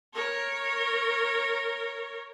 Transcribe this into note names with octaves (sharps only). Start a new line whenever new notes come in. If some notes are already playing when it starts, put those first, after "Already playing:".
A#4 C#5